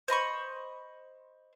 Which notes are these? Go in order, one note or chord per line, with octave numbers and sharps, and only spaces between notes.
C5 D#5 B5 C#6